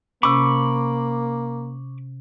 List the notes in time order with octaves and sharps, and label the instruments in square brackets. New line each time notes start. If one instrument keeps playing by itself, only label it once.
[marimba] C3 C#4 [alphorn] A#3 [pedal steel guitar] B5 C#6 D6